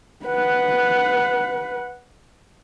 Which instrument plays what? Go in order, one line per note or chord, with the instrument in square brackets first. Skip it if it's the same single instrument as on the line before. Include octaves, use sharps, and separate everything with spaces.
[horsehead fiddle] B4 F#5